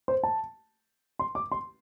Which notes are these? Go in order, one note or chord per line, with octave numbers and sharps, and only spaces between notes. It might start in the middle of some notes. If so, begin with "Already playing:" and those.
C5
A5
C6
D6
C6